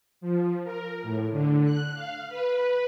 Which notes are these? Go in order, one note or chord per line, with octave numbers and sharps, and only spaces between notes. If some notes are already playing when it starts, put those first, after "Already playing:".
F3
A#4
A2
D3
F#6
F5
B4